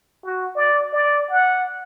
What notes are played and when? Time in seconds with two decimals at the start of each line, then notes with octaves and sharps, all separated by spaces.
0.24 F#4
0.56 D5
0.93 D5
1.30 F#5